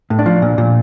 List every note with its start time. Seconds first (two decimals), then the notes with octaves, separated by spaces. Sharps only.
0.10 A2
0.19 D4
0.26 F3
0.42 A#2
0.58 A#2